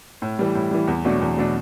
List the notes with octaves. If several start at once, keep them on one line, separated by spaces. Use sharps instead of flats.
A2
E3 G3
A2
E3 G3
E2
B2 F#3 A3 D4
E2
B2 F#3 A3 D4